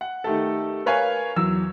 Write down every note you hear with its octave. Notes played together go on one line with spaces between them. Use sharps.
F#5
D#3 A3 G4 A4
A#4 B4 C#5 F5 G#5
E2 F#3 E6